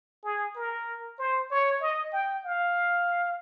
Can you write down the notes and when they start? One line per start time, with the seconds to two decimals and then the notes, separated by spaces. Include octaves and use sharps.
0.24 G#4
0.56 A#4
1.19 C5
1.51 C#5
1.81 D#5
2.13 G5
2.45 F5